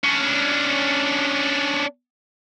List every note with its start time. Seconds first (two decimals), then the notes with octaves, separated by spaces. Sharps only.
0.04 C#4 D4